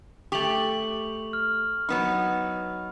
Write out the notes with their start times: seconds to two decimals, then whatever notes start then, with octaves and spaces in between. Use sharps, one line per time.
0.32 A3 G4 C#6 F7 F#7
1.33 F6
1.89 F#3 B3 D#4 B5